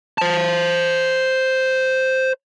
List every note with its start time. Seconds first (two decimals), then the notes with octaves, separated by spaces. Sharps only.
0.18 C5 A5